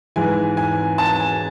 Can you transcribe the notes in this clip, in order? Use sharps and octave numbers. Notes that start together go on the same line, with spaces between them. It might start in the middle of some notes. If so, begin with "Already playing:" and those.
G#2 E3 G#5
G#5
A5
G#5